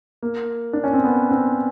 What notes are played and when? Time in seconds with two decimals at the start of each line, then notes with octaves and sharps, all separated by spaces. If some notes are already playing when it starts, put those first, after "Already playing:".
0.23 A#3
0.73 D4
0.84 C#4
0.93 C4
1.04 B3
1.31 C4